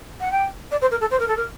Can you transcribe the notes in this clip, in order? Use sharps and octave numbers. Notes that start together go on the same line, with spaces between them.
F#5
G5
D5
C5
A#4
A4
C5
A#4
A4
A#4